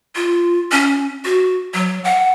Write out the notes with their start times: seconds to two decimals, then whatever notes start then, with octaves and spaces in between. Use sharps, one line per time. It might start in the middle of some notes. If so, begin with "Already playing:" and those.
0.16 F4
0.71 C#4
1.25 F#4
1.74 F#3
2.04 F#5